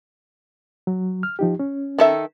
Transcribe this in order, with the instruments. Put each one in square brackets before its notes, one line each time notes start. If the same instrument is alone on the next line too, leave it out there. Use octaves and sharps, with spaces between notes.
[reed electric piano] F#3
F6
F3 D#4 G4
C#4
[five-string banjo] D#3 A4 E5